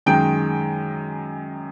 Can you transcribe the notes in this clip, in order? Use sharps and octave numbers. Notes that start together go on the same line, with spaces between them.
F#2 D#3 G#3 G5